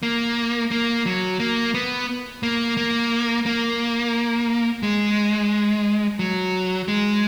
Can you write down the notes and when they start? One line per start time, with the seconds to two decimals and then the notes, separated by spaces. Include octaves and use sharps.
0.03 A#3
0.71 A#3
1.06 F#3
1.40 A#3
1.74 B3
2.43 A#3
2.77 A#3
3.46 A#3
4.83 G#3
6.19 F#3
6.88 G#3